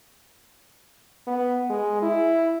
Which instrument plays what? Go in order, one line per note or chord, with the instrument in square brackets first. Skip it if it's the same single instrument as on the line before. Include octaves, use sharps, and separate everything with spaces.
[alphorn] B3
G#3
E4